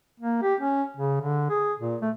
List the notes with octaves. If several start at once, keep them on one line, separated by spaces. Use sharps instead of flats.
A#3
G4
C#4
C#3
D3
G#4
A#2
A3